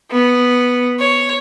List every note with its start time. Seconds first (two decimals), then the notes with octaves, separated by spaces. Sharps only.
0.11 B3
1.00 C#5